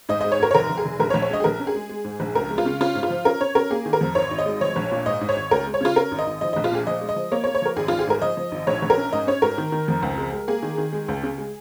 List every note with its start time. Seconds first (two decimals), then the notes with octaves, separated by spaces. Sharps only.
0.09 G#2 D#5
0.21 G#3 D#5
0.32 C#5
0.40 G#2 A#4
0.51 C#5
0.54 F1 A#4
0.69 F1
0.77 G#4
0.85 F1
1.00 A#1 A#4
1.10 C#5
1.14 A#1
1.22 C#5
1.30 G#3 D#5
1.40 G#4
1.44 A#1 A#4
1.60 C#4
1.67 G#4
1.75 G#3
1.89 G#3
2.04 G#2
2.20 A#1
2.34 C#2 A#4
2.50 G#3
2.58 F4
2.65 C#3
2.80 C#4 F4
2.95 G#2
3.03 F4
3.10 F3
3.25 C#4 A#4
3.40 C#4 C#5
3.55 C#4 A#4
3.70 A#3 G#4
3.86 D#3
3.93 A#4
4.01 F2
4.15 G#1 C#5
4.31 G#1
4.38 D#5
4.46 G#3
4.61 F3 C#5
4.76 A#1
4.92 A#2
5.06 G#2 D#5
5.21 G#2
5.29 C#5
5.36 G#1
5.51 C#2 A#4
5.67 G#3
5.74 C#5
5.81 C#3 F4
5.96 C#4 A#4
6.11 G#1
6.19 D#5
6.27 G#1
6.41 F3 D#5
6.53 A#1 D#5
6.64 F4
6.72 A#2 G#4
6.87 F3 D#5
7.01 G#3
7.09 D#5
7.16 F3
7.32 A#3 C#5
7.44 C#5
7.46 A#3
7.55 C#5
7.62 F3 A#4
7.76 G#1 G#4
7.88 G#1 F4
7.99 G#4
8.07 G#2 A#4
8.22 F3 D#5
8.37 F3
8.52 G#1
8.67 A#1 C#5
8.82 A#1
8.90 A#4
8.97 C#4
9.13 G#2 D#5
9.27 C#4 C#5
9.42 G#2 A#4
9.58 D#3
9.72 D#3
9.88 F2
10.02 C#2
10.18 G#3
10.32 G#3
10.48 A#3 G#4
10.63 D#3
10.78 D#3
10.92 G#3
11.08 C#2
11.23 C#3
11.38 G#3